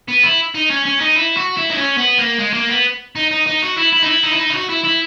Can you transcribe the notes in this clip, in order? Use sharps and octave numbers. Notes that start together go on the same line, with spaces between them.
B3
E4
D#4
C#4
C#4
D#4
E4
F#4
E4
D#4
C#4
B3
A#3
G#3
A#3
B3
D#4
D#4
D#4
F#4
E4
E4
D#4
E4
D#4
E4
D#4
E4
F#4
E4
E4